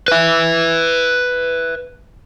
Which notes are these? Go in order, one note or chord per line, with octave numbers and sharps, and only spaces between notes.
B4 E5